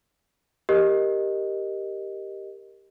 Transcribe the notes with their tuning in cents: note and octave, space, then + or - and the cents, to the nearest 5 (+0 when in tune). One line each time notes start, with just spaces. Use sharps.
G4 +0 A#4 +0 D#5 -10